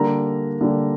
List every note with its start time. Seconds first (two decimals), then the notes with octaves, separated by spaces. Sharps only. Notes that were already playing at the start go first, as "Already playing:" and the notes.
Already playing: D3 G3 A#3 A#5
0.61 D3 G3 A#3